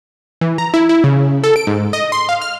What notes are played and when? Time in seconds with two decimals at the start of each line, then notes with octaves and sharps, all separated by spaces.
0.41 E3
0.58 A#5
0.74 E4
0.89 E4
1.04 C#3
1.44 A4
1.56 D7
1.67 G#2
1.93 D#5
2.12 C6
2.29 F5
2.42 F6